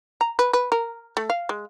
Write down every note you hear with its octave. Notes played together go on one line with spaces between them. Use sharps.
A#5
B4
B4
A#4
A3
F5
G#3